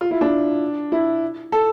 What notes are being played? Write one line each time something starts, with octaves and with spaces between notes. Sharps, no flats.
F4
E4
D4
E4
A4